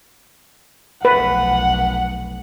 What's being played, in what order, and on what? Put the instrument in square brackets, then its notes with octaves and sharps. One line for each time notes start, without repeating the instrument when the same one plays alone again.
[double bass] F1 B1 [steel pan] B4 [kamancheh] F#5